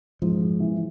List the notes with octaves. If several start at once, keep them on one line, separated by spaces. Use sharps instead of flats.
G#2 F3
G#2
E3